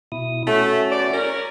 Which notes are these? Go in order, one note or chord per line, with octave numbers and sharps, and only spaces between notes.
B2 E4 D#6
A3 C#4 F#4
E2 D5
C#4 A#4